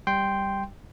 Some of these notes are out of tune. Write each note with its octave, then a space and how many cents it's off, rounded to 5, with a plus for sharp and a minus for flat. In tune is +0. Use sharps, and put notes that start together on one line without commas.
G3 +5 G5 +0 C6 -5